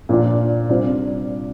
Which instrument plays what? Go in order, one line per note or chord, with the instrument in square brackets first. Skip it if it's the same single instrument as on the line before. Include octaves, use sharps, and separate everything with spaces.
[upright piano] A#2 F3 D4 F4
C3 G3 D4 F4 C5